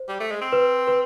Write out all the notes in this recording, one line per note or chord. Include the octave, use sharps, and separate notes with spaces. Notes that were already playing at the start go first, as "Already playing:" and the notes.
Already playing: C5
G3
A3
G#3
C4
B4
B4